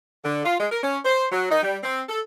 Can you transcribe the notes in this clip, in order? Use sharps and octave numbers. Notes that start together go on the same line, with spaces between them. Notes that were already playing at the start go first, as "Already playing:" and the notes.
D3
F4
G#3
A#4
C#4
C5
F#3
D#4
G3
C4
A4